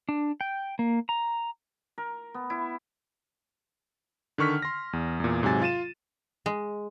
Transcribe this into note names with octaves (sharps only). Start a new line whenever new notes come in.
D4
G5
A#3
A#5
A#4
B3
E4
D3 D#3 C#6 F6 B6
C6 A#6
E2
E2 A#2
G#2 C3 F#3 G#5 A6
F4 A6 D#7 E7
G#3